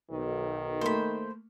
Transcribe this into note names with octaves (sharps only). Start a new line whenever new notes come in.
B1 D#3
A3 A#3 C5 B5